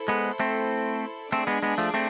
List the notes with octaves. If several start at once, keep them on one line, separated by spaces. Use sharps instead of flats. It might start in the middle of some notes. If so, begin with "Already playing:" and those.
Already playing: E4 A4 C5
G#3 B3
A3 C4
A3 C4 D4 G#4 D5
G#3 B3
G#3 B3
F3 A3
A3 C4